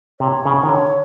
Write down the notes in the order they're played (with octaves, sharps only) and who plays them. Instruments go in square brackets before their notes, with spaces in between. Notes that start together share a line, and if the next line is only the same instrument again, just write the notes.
[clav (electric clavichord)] C3 [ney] C#5
[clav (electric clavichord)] C#3
D#3
D3